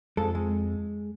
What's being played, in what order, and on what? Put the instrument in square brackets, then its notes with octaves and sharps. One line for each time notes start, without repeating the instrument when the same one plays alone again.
[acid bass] F2 [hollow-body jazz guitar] G#3 A4
[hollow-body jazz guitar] G#3